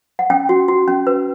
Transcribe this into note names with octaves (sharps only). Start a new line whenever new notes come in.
F#5
C#4 G5
F#4
F#4
C#4
B4